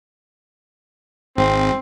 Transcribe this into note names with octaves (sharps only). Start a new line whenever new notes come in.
G#1 C4